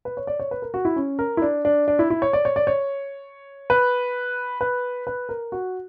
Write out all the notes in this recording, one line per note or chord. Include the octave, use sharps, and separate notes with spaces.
B4
C#5
D5
C#5
B4
A#4
F#4
E4
C#4
A#4
E4
D4
D4
D4
E4
E4
C#5
D5
C#5
D5
C#5
B4
B4
B4
A#4
F#4